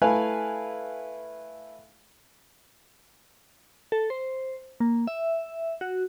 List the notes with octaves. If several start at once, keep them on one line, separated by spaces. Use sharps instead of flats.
A3 E4 B4 F5 G#5
A4
C5
A#3
E5
F#4